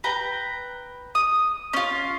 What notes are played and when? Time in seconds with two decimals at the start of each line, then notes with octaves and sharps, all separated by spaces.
0.04 B4 G5 A#5
1.15 D#6
1.73 C#4 F4